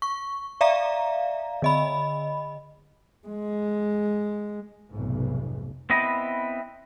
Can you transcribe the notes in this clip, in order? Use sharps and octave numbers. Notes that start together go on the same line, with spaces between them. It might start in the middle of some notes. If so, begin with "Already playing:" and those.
C#6
D5 E5 F5 A#5
D3 D#5 B5
G#3
F1 B1 G#2
B3 C4 E4 D#5